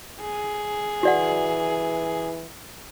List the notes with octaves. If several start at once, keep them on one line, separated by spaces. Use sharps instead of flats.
G#4
E3 F#4 D5 F#5